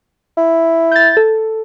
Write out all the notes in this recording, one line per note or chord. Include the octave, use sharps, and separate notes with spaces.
E4
G6 A6
A4